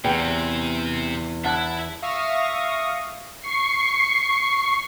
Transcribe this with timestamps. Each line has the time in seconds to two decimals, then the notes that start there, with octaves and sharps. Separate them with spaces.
0.04 E2 C3 G5
1.44 E4 E5 F#5 A5 F#6
2.02 E5 F5 C#6 D#6 A#6
3.42 C#6 C7